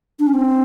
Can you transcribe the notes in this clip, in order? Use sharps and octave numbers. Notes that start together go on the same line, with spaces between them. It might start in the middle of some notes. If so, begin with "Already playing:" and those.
D4
C#4
C4